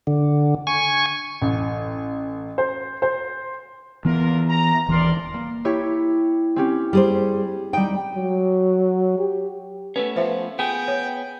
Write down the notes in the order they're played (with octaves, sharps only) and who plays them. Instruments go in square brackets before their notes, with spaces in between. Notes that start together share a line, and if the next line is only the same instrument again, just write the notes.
[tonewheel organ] D3
G#5 C#6
[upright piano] A1
C5
C5
[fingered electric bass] E3 B3 [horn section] F4 A#4
[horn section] A#5
[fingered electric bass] D#1 E3 [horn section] A#4 D5 C6
[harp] A#3
E4 G4 C#5
C4 C#4 G4
[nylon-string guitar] G3 G#4 C5
[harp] G3 D#4 [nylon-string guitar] G5
[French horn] F#3
G4
[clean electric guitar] A3 B3 C#4 [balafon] B4
[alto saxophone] F3 [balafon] C5 E5
[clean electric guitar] B3 G#4 [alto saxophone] G5
[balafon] C#5